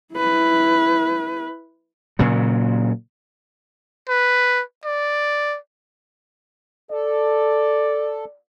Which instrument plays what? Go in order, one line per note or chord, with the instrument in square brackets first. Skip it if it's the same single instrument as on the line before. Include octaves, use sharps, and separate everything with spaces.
[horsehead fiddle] E4 B4
[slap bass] A#2 C#3 F#3
[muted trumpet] B4
D5
[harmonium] A4 [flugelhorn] D5